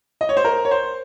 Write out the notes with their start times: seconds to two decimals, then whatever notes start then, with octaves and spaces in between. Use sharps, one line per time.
0.21 D#5
0.29 C#5
0.37 C5
0.44 A#4
0.65 C#5
0.71 C5